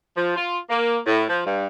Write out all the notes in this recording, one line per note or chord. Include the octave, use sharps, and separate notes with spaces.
F3
F4
A#3
A2
F3
G2